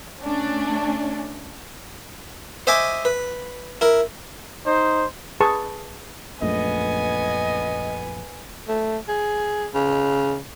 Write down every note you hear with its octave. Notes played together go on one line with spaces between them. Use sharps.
A3 C#4 D4
C5 D#5 E5 G#5 D6
B4
E4 A#4
D#4 C5
G#4 B4 A5 C#6
A#1 F#2 A3 B3 D#5 G#5
A3
G#4
C#3